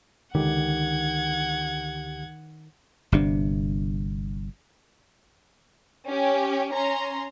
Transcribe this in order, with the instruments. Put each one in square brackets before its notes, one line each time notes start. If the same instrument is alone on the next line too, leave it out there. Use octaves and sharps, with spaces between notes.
[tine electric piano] C#2 D3 G4 [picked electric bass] D#3 [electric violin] F#5 G#6
[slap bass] G1 C3 D4
[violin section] C#4 G4
C#4 A#5 C6